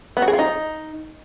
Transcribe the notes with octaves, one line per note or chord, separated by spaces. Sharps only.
B3
F#4
G#4
F4
D#4